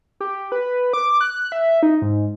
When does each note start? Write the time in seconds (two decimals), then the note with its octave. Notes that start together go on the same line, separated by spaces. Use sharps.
0.20 G4
0.52 B4
0.93 D6
1.21 F#6
1.52 E5
1.83 D#4
2.02 G#2